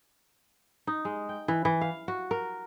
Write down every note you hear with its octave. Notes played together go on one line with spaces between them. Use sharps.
D#4
G#3
G5
E3
E3
F5
F#4
A#4